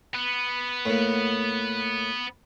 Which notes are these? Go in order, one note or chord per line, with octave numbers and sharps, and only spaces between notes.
B3
A2 A#3